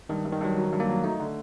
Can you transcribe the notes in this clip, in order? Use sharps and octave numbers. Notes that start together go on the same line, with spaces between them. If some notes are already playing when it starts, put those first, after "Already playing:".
G2 D#3
G2
D#3
G2 F#3
F#3
G2
A#3
F#3
A3 D#4
D3